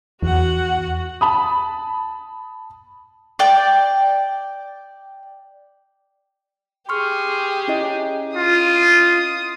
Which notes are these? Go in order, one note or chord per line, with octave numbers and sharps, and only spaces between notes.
E2 F#4 F#5
A5 B5 D#6
D5 G5
G4 G#4 C6 C#6 F6
C#4 E4 D#5
F4 D#6